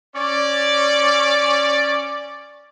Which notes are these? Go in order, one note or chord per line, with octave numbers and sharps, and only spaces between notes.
C#4 D5